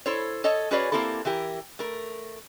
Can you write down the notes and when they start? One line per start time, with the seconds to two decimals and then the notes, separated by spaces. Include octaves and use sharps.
0.06 E4 A4 C5 C#5
0.44 A4 C#5 D#5 A5
0.71 C#4 F#4 G#4 B4 C#5 D5
0.92 A#3 C4 E4 G4 A4
1.25 E3 E4 G4 A#4
1.79 A3 A#4